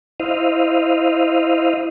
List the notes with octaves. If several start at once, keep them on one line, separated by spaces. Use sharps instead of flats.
E4 C5 D#5 F5